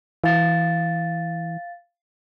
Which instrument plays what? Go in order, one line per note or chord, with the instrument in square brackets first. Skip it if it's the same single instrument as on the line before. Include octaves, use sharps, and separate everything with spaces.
[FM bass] E3 [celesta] F5 A6